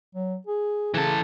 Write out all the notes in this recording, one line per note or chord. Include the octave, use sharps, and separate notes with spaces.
F#3
G#4
C#3 E3 A4